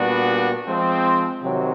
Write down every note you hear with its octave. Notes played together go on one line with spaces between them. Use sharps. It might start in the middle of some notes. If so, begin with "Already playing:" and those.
Already playing: A#2 G3 B3 D4 F#4
F3 G#3 C4
C3 D#3 F#3